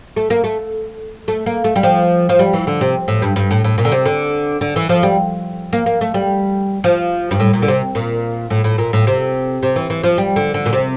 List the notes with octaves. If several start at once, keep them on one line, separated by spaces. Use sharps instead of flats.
A3
A#3
A3
A3
A#3
A3
G3
F3
F3
G3
E3
D3
C3
A2
G2
G2
A2
A2
A#2
D3
C3
D3
D3
E3
F3
G3
A#3
A#3
A3
G3
F3
G2
A2
A#2
D3
C3
A#2
A2
A2
A#2
A2
C3
C3
E3
E3
F3
G3
D3
D3
A#2
C3